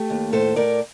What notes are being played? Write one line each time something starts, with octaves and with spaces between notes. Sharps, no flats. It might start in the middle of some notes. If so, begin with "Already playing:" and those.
Already playing: A3 G4
D#2
A2 A4 C5
A2 A#4 D5